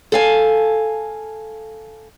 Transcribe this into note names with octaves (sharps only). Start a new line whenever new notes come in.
A4 F5 G#5